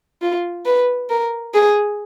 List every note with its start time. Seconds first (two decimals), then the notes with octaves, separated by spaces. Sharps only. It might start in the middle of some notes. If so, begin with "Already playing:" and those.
0.22 F4
0.66 B4
1.10 A#4
1.54 G#4